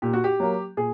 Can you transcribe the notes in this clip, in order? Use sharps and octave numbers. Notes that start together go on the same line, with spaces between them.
A#2 G4
F#4
G4
F#3 A#3
A#2 G#4